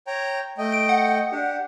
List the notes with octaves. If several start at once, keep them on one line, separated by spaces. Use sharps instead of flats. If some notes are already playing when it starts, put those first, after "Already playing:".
C#5 G5 A#5
A3 D#5 G5
D7
F#5
D4 G4